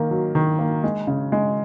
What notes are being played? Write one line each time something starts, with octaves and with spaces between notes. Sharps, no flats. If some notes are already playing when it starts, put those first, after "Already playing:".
Already playing: D#3 A#3
F#3
D#3
A#3
G#3
C#3
G#3